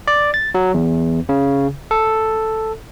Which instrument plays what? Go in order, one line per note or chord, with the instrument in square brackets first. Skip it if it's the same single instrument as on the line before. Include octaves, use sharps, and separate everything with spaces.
[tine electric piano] D5
A6
F#3
E2
C#3
A4